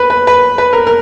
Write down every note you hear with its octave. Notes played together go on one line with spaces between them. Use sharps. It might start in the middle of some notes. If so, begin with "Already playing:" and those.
Already playing: B4
B4
B4
B4
A#4
A#4